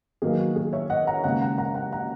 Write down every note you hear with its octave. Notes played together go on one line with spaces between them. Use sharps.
E2 D#3 F#3 A#3 G#4
F#4
G#4
C#5 E5
D#5 F#5
F#5 A#5
D#2 C#3 G#3 F#5 A#5
F#5 A#5
F#5 A#5
F#5 A#5
F#5 A#5